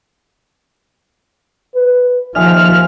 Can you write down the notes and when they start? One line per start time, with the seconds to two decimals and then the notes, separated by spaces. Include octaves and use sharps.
1.74 B4
2.35 D#2 F3 G#4 E5 F6